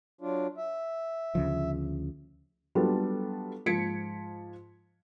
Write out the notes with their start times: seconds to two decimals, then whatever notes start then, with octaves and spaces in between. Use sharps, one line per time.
0.21 F#3 D4 F4
0.58 E5
1.35 D2 C#3 F3
2.75 F#3 G3 B3 D4 F4 A4
3.66 G#2 F3 G#6 B6 C#7 D7